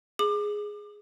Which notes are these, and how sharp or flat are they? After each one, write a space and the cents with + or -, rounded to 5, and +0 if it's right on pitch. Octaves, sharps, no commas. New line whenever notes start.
G#4 +0 D6 +30